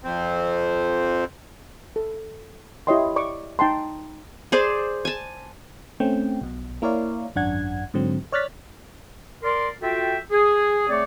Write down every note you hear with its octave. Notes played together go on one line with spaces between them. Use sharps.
F2 C4
A4
E4 G4 C#5 D#5 G5 C6
D5 C#6 D6
D#4 G5 A5 C6
G#4 C5 D5
G#5 A5
A3 C4 C#4 G5
B1 B2
A#3 E4 A#4 C#5 D5 F5
G#1 F#2 D4 F#5 G#6
G#2 D3 F#3 C4
C#5 D5 F6 F#6 A6 B6
A#4 D5 C6
F4 F#4 A4 E5 G5
G#4
A3 C4 G#4 C#5 D5